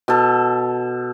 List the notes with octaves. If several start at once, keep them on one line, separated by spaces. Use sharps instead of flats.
B2 A4